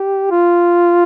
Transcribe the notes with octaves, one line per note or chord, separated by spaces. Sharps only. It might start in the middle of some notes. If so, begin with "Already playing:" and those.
Already playing: G4
F4